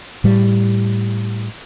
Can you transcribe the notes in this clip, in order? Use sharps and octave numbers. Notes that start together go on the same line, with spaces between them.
A2 G3